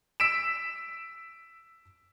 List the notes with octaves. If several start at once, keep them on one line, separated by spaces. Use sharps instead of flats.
E6 B6 D7 E7